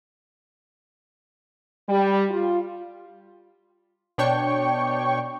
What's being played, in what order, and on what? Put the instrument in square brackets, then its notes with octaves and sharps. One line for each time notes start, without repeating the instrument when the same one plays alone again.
[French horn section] G3
F4
[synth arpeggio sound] B2 D4 C#5 G5 C#6